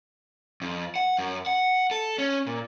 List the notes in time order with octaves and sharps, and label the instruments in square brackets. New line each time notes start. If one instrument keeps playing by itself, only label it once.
[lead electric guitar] F2
F#5
F#2
F#5
A4
C#4
A#2